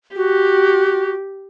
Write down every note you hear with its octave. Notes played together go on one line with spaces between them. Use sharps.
F#4 G4